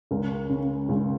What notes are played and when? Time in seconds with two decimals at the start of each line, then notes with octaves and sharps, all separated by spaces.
0.11 C#2 A#4
0.49 C#3
0.89 C#2